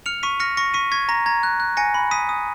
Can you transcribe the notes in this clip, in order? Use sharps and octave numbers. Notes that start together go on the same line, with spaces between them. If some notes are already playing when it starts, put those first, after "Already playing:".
F6 C#7 F7
C#6 B6 D#7
F6 A#6 C#7
C#6 A#6 C#7
C#6 B6 D#7
C#6 G#6 B6
A#5 A#6
A#5 G#6
F#6
F#6
G#5 A#6 C#7
B5
D#6 B6 D#7
D#6